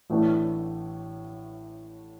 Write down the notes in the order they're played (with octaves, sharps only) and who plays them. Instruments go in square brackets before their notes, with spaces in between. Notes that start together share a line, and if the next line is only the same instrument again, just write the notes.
[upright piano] A1 A2 E3 A3 D4